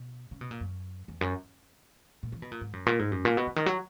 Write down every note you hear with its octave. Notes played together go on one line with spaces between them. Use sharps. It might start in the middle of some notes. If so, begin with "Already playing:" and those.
Already playing: B2
C#3
B2
A#2
F#2
E2
F#2
A#2
E3
B2
A#2
G#2
F#2
A#2
G#2
F#2
A#2
B2
C#3
D#3
F#3